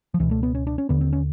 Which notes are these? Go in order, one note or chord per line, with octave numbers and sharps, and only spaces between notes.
F3
C#2 B2 E3
A3
B3
C#4
D4
C#4
D#2 D3 B3
C4
C#4